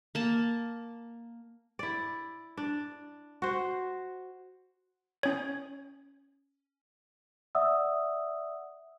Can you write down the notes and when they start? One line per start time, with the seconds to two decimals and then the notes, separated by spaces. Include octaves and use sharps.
0.15 A#3 A5
1.79 E4 D5
2.57 D4
3.42 F#4 C5
5.23 C#4 C#5
7.55 D5 E5 F#5 D#6 E6